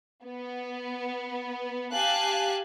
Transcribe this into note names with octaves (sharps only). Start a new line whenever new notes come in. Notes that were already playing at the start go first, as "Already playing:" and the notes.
B3
G4 F5 G#5 A5 F#6